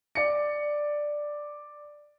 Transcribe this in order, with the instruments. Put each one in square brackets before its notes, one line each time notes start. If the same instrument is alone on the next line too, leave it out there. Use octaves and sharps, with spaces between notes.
[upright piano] D5 C#7